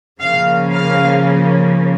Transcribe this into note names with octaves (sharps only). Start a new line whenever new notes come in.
C#3 F3 A#3 C#4 F5
F5